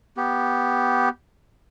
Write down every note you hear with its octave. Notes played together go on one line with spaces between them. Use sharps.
B3 G4